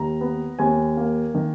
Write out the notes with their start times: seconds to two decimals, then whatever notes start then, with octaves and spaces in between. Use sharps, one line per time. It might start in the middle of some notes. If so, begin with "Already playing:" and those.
Already playing: D#2 A#5
0.21 B3
0.59 D#2 G#5
0.97 A#3
1.34 D#3